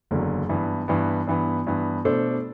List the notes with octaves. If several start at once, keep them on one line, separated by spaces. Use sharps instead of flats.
F#1 E2 D3 F#3
G2 E3 B3
G2 E3 B3
G2 E3 B3
G2 E3 B3
B2 A3 D4 A4 C5